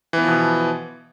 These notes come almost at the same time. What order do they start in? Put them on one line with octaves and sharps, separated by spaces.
E3 B3 F3 B2